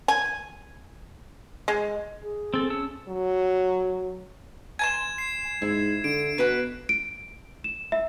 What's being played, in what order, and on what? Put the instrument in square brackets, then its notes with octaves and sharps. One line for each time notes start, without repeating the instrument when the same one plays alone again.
[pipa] G#5
G#3
[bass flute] G#4
[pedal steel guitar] C4 A4
C#4 A5 E6
[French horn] F#3
[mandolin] G#5 A5 C6 [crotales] G#6 E7
[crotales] C7
[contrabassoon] G#2 [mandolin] E4
[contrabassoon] D3 [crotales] D7
[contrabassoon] B2 [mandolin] F#4 B4
[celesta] D7
E7
E5